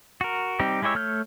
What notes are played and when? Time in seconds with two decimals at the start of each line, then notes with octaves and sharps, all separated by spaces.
0.21 F#4 A#4
0.60 G3 C4 D#4 G4
0.82 G#3 E4 G4 C#5 E5
0.95 A3 C#5 F6 G6